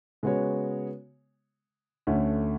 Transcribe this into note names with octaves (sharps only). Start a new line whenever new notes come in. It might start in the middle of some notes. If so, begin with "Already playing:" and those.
C#3 G#3 B3 F#4 C#5
D2 D3 A3 C#4